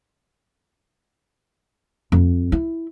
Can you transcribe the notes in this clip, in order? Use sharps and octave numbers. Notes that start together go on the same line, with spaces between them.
F2
E4